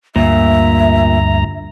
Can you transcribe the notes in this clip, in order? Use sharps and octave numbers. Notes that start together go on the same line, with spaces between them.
D2 G2 A#2 E5 A#5